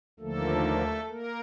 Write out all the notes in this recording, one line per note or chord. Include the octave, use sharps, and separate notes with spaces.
D#2 D3 F3 A3 A#3 A4
A#3 A#4